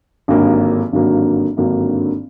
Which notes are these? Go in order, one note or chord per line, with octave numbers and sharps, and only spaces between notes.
G#1 G2 D3 F#3 A#3
G#1 G2 D3 F#3 A#3
G#1 G2 D3 F#3 A#3